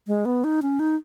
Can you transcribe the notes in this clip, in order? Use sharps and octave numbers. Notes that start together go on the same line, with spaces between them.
G#3
B3
D#4
C#4
D#4